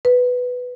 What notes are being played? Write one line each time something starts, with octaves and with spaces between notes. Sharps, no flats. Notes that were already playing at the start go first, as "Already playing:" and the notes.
B4